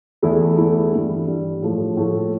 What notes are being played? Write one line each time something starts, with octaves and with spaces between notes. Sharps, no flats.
E2 E3 A3 E4
E2 E3 A3 E4
G2 E3 G3
G2 E3 G3
A2 F3 A3
A2 F3 A3